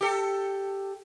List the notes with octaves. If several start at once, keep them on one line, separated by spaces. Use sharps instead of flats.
G4 A4